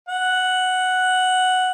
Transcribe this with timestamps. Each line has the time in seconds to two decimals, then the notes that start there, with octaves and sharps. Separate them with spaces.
0.09 F#5